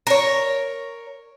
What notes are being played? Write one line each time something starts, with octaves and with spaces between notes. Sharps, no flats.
A#4 C#5